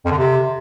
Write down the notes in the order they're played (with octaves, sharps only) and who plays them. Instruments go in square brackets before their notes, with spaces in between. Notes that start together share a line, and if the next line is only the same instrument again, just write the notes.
[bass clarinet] F2
D3
C3